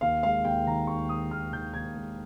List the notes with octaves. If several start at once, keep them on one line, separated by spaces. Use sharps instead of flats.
D#2 F5
G#3 F5
D#2 G5
D#3 A#5
D#2 C#6
G#3 D#6
D#2 F6
D#3 G6
D#2 G#6
G#3